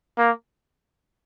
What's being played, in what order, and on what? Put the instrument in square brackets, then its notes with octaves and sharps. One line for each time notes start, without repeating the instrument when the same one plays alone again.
[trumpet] A#3